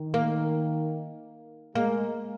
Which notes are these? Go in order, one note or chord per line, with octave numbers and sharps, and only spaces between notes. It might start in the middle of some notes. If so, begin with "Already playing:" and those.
Already playing: D#3
A#3
G#3 A#3